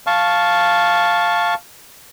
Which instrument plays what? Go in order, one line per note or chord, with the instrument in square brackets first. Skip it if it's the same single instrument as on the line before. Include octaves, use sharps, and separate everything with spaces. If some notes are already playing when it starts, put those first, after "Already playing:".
[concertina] F5 A5 C#6